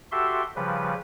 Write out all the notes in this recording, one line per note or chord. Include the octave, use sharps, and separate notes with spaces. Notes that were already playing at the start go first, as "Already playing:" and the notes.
F#4 G4 A4 E5 C6
C#3 F3 G3 B4